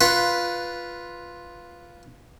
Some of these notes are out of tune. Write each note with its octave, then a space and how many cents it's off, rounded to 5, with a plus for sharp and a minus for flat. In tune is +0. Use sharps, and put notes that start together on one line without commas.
F4 +0 B4 -5 F#5 +10